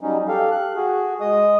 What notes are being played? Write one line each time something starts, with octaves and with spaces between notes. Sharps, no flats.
F#3 G3 C#4 D#4
G4 A4 F5
F#6
F#4 G#4
G#3 D#5 D#6